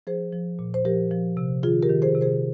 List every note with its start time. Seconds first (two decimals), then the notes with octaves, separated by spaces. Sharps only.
0.07 F3 G#4 C5
0.33 F3
0.59 A#2
0.74 C5
0.85 F3 G4 A#4
1.11 F3
1.37 C3
1.63 D#3 F4 G#4
1.83 G4 A#4
1.89 D#3
2.02 G#4 C5
2.15 C3
2.21 G#4 C5